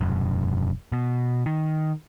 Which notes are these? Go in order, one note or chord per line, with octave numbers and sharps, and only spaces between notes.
E1 F#2
B2
D#3